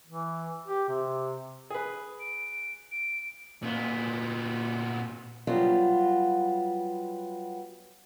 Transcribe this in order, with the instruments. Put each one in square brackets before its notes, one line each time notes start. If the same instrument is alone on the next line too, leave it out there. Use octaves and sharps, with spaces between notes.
[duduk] E3
G4
C3
[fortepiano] G#4 B4
[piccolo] D7
D7
[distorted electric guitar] A#2 B3
[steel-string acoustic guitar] F#3 G3 B3 F4